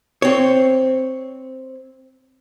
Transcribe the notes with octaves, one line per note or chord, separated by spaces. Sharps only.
C4 C#5